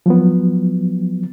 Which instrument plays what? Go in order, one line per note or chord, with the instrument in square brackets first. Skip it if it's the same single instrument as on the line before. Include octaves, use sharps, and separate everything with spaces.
[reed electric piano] F3 F#3 B3